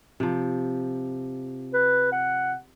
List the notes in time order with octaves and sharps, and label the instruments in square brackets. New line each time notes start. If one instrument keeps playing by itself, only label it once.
[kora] C3 F3
[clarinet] B4
F#5